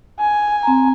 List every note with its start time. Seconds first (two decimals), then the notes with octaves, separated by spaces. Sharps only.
0.20 G#5
0.63 C4 A#5